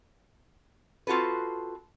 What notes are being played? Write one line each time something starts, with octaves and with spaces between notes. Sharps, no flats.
C4 F4 F#4 A4 B4